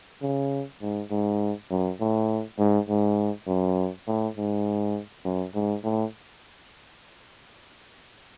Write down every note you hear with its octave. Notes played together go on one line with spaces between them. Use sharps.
C#3
G#2
G#2
F#2
A2
G#2
G#2
F#2
A2
G#2
F#2
G#2
A2